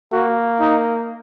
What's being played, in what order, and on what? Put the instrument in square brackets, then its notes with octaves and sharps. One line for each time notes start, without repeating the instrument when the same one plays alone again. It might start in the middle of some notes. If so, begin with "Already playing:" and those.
[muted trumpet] A#3 [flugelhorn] F#4
[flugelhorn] D#4